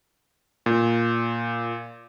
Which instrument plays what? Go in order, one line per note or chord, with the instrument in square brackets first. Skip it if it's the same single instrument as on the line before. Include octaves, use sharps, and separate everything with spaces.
[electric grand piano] A#2